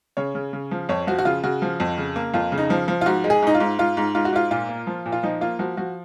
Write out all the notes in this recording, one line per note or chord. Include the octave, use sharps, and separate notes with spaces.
C#3 C#5
C#3
C#3
F3
F2 C#5
F3 F#4
F#4
C#3 F4
C#3 F#4
F3
F2
C#3
A#3
F2 F4
C#3
D#4
F3
F3
F4
G#2 F#4
G#3
G#4
G#2 D#4
F4
G#2
G#2 F4
G#2
G#2 F4
F#4
G#2 F4
A#2 F4
A#3
F3
A#2
F4
F3 D#4
A#3 F4
F3 F#4
F3 F#4